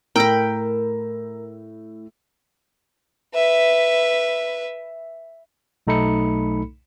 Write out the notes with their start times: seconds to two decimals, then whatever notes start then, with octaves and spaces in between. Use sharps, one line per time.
0.16 A2 A#4 G5 B5 E6 A#6
3.34 B4 E5
5.87 B1 A3 D#4 A4 B5 C#7